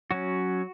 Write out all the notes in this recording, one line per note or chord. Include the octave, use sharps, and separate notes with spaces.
F#3 C#4 F#4